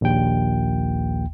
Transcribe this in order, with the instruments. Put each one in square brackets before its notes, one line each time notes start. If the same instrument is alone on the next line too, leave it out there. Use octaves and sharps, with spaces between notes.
[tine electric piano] A#1 D#2 G5